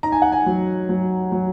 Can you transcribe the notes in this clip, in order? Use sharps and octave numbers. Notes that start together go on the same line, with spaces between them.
D#4 A#5
G#5
F#5
G#5
F#3
F#3
F#3